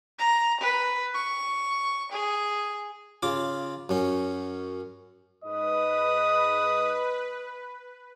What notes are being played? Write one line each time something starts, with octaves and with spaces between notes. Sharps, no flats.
A#5
B4
C#6
G#4
C#3 F4 D6
F#2 C#4
G#2 B4 D#5 D#6